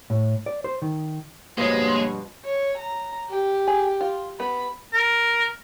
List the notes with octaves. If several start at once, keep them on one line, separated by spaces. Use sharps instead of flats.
A2
D5
C5
D#3
G2 B2 F3 G#3 A#3 B4 C#5 D#5
C#5
A#5
G4
G#4
F4
B3 B5
A#4